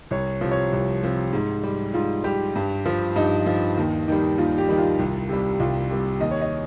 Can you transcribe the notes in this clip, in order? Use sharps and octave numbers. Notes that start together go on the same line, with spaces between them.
C2 C#5
C3 F3
C#5
C2
C3 F3
G#2
G3
G#2 F4
G3 G4
G2
F3
G2 D#4
F3
D#2
D#3 G3
D#2 F4
G4
D#3 G3
F4
C2
C3 G3
C2 F4
C3 G3
D#2 D#5
C#5
D#5